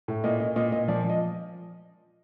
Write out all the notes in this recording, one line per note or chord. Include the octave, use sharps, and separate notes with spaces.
A2
A#2 D#5
A#2 D#5
A#2 D#5
A#2 D#5
F3 D5
F3
D#5